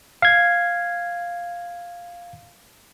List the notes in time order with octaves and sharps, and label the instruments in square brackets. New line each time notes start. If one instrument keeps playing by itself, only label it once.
[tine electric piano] F5 G#6